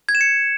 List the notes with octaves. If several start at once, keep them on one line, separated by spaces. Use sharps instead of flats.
G#6
E7
C#7